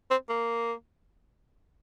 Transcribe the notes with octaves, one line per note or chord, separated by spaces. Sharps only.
C4
A#3